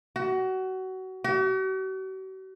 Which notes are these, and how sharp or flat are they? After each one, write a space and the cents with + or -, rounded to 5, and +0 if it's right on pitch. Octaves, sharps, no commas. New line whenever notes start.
F#4 +25
F#4 +45